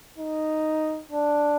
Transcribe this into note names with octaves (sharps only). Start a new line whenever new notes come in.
D#4
D4